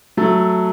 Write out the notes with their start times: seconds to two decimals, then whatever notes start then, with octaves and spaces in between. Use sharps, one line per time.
0.17 F#3 A3